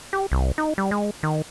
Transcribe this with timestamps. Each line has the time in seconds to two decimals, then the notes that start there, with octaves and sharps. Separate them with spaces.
0.13 G4
0.32 C2
0.58 D#4
0.78 G3
0.91 G#3
1.23 D#3